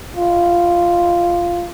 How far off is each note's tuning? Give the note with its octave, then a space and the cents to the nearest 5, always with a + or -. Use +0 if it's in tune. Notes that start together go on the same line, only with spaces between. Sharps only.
F4 -5